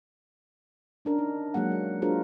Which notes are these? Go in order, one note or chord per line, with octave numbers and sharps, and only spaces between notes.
C#4 D4 A#4
D#4
F#3 G#3 A#3 F#5
G#3
D4 F4 F#4 G#4 A#4 C5